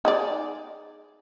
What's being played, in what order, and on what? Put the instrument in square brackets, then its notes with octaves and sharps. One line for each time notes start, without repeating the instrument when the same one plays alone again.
[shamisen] D#4 G#4 D5